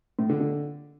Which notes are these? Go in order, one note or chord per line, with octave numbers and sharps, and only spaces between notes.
A2
D3
D3